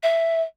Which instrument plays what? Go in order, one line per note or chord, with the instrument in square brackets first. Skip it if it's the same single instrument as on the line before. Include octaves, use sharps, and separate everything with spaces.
[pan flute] E5